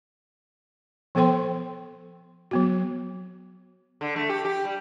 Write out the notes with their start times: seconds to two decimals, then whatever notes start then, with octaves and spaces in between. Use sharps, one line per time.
1.15 F3 B3 A4 C5 G5 C6
2.51 F#3 B3 F#4
4.01 D3
4.16 A3
4.29 G4
4.45 G4
4.65 G3